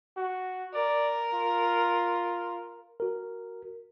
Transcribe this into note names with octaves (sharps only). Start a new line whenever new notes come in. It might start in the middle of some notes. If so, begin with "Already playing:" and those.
F#4
A#4 D5
F4
F#4 A#4